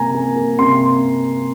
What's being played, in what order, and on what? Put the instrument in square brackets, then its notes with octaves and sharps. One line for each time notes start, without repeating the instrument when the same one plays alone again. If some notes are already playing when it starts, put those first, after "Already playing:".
Already playing: [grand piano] C3 A#3 G#5 A#5
A#3
A#3
C3 C6